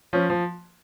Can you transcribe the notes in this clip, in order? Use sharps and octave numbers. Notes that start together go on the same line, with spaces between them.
F3 C#4
F3